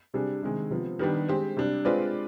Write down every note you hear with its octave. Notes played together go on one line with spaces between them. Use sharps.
C3 G3 D4 G#4
C3 D#3 G#3
C3 F3 B3
D#3 G3 B3 D4 G4
G#3 C4 G4 C5
C3 G3 D4
G#3 C4 F4 B4 D5